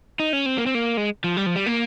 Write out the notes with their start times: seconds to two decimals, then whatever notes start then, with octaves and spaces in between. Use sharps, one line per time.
0.20 D#4
0.33 C#4
0.46 C4
0.58 A#3
0.66 C4
0.74 A#3
0.97 G#3
1.24 F3
1.37 G3
1.46 F3
1.56 G3
1.66 A#3